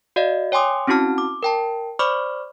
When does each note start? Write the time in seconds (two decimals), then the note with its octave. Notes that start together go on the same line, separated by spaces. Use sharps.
0.16 F#4 D5 D#5 F5
0.52 C#5 G5 G#5 C6 D6 D#6
0.87 C4 C#4 E4 F#4 A5 F6
1.18 D6
1.43 A#4 G5 A5
1.99 C5 D5 B5 C#6 D6 F6